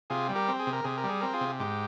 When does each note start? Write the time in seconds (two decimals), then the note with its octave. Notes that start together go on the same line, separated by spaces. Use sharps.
0.10 C3 F4 G#4
0.29 G3
0.35 G4 A#4
0.48 C4
0.59 G#4
0.67 C3
0.73 A#4
0.84 C3 G#4
0.97 A#4
1.04 G3
1.09 G#4
1.21 C4 A#4
1.33 F4 G#4
1.41 C3
1.59 G#2 G4